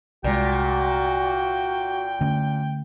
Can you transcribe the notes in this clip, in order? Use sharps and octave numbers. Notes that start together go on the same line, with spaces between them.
C2 A#2 G#3 F#4 G5
D3 A3 C#4